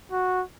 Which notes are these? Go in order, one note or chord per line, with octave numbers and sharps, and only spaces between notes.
F#4